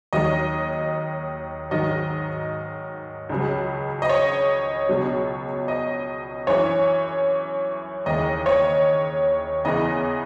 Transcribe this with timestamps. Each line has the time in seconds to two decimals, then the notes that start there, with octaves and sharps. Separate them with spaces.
0.13 D#2 D#3 F#3 D#5
1.71 G#2 D#3 F#3 D#5
3.29 C#2 C#3 F#3
4.02 D#5
4.09 C#5
4.89 C#2 B2 F#3
5.68 D#5
6.47 F#2 E3 C#5
8.06 D#2 C#3 E3 D#5
8.46 C#5
9.65 E2 C#3 E3 D#5